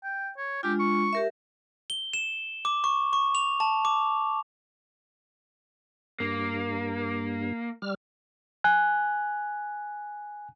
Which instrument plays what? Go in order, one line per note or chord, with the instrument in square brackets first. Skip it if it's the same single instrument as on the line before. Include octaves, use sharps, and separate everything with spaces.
[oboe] G5
C#5
[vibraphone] G#3 D4 F4 [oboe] G4
[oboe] C#6
[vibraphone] G4 A#4 E5
[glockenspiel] G7
E7
D6
C#6
C#6
F7
A5
D6
[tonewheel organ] G2 [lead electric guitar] A#3
[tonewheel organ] G3 F6
[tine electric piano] G#5 F#6